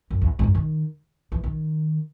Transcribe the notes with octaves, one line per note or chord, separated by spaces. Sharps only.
F#2
E2
G#2
F#2
D#3
E3
D#3